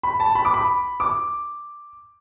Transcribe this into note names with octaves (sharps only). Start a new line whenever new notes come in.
B5
A5
B5
D6
B5
D6